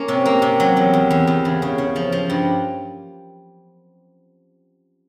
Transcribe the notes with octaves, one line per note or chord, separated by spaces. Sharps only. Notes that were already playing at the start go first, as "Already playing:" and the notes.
Already playing: A#3 C#4
C3
A#3
C3
F#3
E2
E2
E2
E2
C#3
C#3
C#3
F3
F3
G2